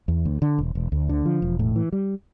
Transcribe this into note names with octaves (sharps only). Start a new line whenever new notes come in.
E2
D2
D3
E1
E1
D2
D3
F3
E1
A2
E3
G3